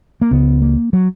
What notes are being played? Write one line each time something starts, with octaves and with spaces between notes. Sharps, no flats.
A#3
C#2 C#3 B3
A#3
F#3